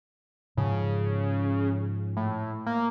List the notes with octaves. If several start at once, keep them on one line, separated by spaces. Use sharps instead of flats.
G#2 C#3 F3
A2
A#3